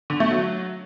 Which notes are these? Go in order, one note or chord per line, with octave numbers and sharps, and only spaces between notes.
D3
A3
F#3